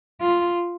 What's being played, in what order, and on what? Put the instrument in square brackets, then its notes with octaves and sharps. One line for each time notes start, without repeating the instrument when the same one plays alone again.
[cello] F4